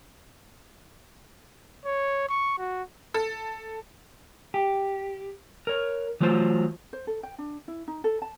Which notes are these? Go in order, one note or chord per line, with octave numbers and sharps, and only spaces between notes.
C#5
C#6
F#4
A4
G4
A#4 C#5
E3 F#3 A3 F4 C5
C5
A4
G5
D4
E4
D#4
A4
A5